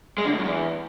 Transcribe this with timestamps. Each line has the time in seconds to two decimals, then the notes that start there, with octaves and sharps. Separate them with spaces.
0.18 G#3
0.25 D3
0.31 A2
0.38 F#2
0.45 E2